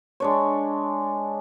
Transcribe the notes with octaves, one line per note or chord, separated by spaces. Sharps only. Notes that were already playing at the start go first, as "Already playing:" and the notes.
G#3 D4 C#5